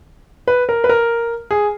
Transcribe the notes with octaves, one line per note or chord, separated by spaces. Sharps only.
B4
A#4
B4
A#4
G#4